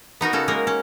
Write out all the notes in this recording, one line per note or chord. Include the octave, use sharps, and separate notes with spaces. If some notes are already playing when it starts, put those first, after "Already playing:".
B3 D#4 F#4 A#4
C#3 C#4 F#4 A4
G#3 A#3 D#4 A#4
C#4